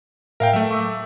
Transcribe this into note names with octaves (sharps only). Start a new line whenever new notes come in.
A2 A#4 E5 F5 G5
F#3 A3 E5
C#6 D6 E6